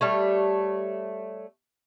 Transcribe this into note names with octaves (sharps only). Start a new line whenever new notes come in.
G3 A3 C#5